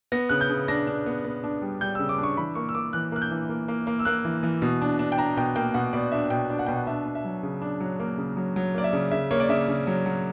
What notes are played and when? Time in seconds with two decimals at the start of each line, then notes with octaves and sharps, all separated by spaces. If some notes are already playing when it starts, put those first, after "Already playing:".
0.12 B3 A#6
0.29 C#3 F#6
0.41 G6
0.49 C#3
0.68 D4 A#6
0.87 D4
1.06 B3
1.24 B3
1.44 D4
1.62 G3
1.81 G3 G6
1.95 C#3 E6
2.09 D6
2.18 D4
2.23 C#6
2.37 E3 B5
2.55 A#3 C#6
2.69 E6
2.75 A#3 D6
2.93 E3 F#6
3.12 A#3 F#6
3.22 G6
3.31 E3
3.49 A#3
3.68 A#3
3.87 A#3
3.99 E6
4.05 A#3 F#6
4.25 E3
4.43 E3
4.62 B2
4.82 D4
4.99 D4
5.12 G5
5.18 D4 A#5
5.37 B2 G5
5.56 A#3 G5
5.74 B2 F#5
5.93 B2 D5
6.12 D4 E5
6.30 B2 G5
6.50 D4
6.59 F#5
6.67 B2 G5
6.75 F#5
6.87 D4 E5
7.06 D4
7.15 E5
7.25 F#3
7.43 C#3
7.62 D4
7.80 F#3
8.00 A#3
8.18 C#3
8.37 F#3
8.56 F#3
8.75 A#3 D5
8.84 E5
8.93 C#3
9.12 C#3 E5
9.31 A#3 C#5
9.40 D5
9.49 C#3 E5
9.68 C#3
9.87 F#3
10.06 F#3